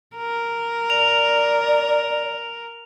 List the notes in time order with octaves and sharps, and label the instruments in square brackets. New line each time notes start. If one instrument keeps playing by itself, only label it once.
[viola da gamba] A#4
[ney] D5 [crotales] F7